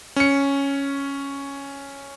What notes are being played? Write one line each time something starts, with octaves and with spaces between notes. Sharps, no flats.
C#4 C#7